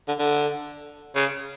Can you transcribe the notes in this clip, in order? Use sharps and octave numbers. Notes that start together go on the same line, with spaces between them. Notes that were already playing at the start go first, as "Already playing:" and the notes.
D3
D3
C#3